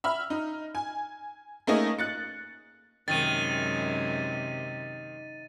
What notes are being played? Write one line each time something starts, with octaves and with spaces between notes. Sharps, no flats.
E5 B5 F6
D#4
G#5
A3 A#3 C#4 D#4 G#4 D#5
F#6 A6 C#7
F#2 C3 D#3 G#3 A6 D#7